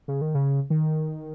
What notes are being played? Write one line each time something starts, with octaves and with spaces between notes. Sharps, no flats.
C#3
D#3
C#3
D#3